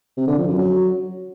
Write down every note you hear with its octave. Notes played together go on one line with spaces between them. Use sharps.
C3
D3
F3
F#2
F#3